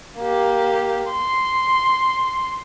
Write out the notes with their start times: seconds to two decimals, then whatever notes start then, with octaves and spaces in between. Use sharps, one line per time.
0.18 A#3 G4
1.11 C6